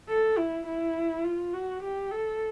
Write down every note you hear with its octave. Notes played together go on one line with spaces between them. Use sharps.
A4
E4
E4
F4
F#4
G4
A4